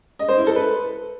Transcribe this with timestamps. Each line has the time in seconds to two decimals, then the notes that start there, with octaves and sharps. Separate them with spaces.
0.19 D#5
0.28 C5
0.38 E4
0.47 A4
0.56 B4